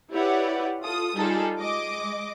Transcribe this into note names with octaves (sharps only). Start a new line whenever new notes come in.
E4 G4 B4 C#5 D5 F#5
F4 A4 D#6
G3 D#4 F4 G#4 A4
G#3 D#5 D6